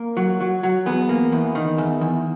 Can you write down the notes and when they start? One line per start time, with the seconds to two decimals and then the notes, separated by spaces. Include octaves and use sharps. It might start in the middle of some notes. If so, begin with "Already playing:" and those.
Already playing: A#3 A#4
0.17 F#3
0.41 F#3
0.63 F#3
0.86 E2 B3 B4
1.09 A#3
1.32 E2
1.55 D#3
1.78 E2
2.01 E2